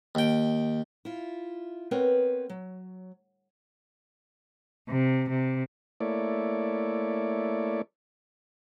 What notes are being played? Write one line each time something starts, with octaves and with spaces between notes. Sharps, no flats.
D#2 G5
E4 F4
B3 C4 A#4 B4 C#5
F#3
C3
C3
A3 A#3 E4 C#5 D5